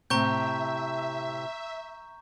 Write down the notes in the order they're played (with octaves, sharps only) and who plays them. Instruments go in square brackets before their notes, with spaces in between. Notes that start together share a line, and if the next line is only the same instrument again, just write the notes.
[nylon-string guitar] A2 C3 [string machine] E5 [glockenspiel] A#5 C#6 G6